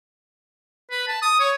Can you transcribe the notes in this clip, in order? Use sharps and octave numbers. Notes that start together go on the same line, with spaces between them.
B4
A5
D#6
C#5